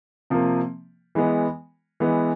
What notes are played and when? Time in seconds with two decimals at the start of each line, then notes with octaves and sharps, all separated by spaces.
0.30 C3 F3 A#3
1.15 E3 G#3 B3
2.00 E3 G#3 B3